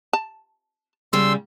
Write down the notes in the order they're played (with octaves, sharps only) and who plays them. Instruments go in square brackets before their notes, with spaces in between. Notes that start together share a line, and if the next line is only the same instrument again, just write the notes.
[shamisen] A5
[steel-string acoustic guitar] C#3 G3 [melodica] C6 E6